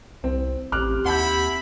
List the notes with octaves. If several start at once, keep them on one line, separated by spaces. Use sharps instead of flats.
C2 C4
A1 C4 G4 D6 F6 F#6
D#2 E4 F#5 A5 B5 G6